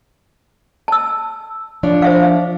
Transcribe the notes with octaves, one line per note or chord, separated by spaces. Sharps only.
A5 E6
F3 D4 C#5
C5 E5 F5